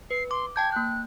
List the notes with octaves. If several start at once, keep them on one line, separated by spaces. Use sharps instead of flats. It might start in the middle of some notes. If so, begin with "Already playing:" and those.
B4 C7
C6 D6
G5 A5 G6 G#6
A#3 F#6 G6